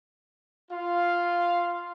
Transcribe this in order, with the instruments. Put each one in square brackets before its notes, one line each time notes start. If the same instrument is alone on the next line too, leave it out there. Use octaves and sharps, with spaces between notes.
[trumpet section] F4 F5